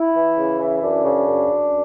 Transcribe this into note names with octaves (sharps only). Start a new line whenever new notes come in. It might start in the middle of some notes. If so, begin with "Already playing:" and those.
Already playing: E4
E3
C#3
E3
F#2 D4
C#3
F#2
F#2